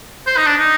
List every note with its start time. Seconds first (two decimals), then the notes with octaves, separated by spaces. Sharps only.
0.27 C5
0.37 D#4
0.46 D4
0.57 D#4